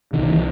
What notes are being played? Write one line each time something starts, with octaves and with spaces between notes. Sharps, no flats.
C2 C3 D#3
E3